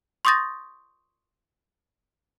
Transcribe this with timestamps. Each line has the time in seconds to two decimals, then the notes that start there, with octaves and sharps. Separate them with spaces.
0.25 C6 C#6 D#6 G6 A6 A#6